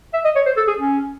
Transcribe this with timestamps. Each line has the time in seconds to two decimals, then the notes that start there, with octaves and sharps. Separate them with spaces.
0.14 E5
0.24 D#5
0.36 C#5
0.46 C5
0.57 A4
0.67 G#4
0.78 C#4